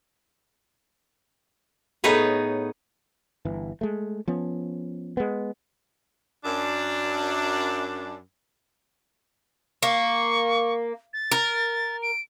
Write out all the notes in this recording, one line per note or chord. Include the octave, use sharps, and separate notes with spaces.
A2 B3 D#4 G#4 B4 C#5
G1 E3
G#3 A3
F3 B3 C#4
G#3 B3
F#2 D4
A#3 C#6
A6
A#4
D7